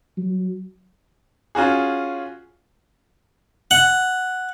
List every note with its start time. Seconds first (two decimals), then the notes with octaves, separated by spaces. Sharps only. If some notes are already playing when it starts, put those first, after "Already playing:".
0.17 F#3
1.55 C#4 F4 F#4 G#4
3.71 F#5